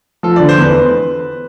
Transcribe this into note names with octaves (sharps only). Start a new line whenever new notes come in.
F3 A4
D3 D5
C5
E2 B4